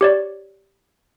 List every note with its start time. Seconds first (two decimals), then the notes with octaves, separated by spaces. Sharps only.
0.01 G4 C#5 D5